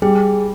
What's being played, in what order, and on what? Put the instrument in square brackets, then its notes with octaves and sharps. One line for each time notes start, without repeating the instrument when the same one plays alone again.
[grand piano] G3 [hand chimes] G#4